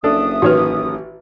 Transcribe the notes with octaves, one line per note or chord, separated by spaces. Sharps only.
F#1 D4 A4 E5 D#6
A1 D#3 F#4 B4 C#5